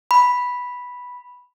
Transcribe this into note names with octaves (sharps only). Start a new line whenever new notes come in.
B5